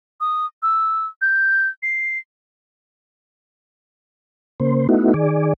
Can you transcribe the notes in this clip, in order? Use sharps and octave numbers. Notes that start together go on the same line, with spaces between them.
D#6
E6
G6
C7
C#3 A#3 C5
A3 B3 D#4 E4 F#4
D#3 G#4 D5